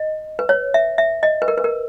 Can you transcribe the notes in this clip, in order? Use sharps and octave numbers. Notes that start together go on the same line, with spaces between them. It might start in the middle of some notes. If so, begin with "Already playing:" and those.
Already playing: D#5
B4
C#5
E5
E5
D#5
B4
A#4
B4
A#4